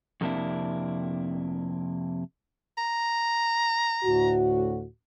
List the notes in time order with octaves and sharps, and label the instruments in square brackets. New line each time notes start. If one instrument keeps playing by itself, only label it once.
[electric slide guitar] F2 C3 A#3 D4 E4
[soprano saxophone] A#5
[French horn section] D2 A2 F#4